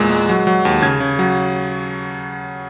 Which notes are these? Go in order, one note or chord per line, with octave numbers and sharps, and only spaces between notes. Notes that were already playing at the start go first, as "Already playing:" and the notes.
Already playing: E2 A#2 G#3
G#3
F#3
F#3
D#2
C#3 G#6
C#3
F#3